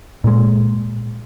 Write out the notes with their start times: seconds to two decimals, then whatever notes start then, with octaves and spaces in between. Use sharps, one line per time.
0.24 A#2 G#3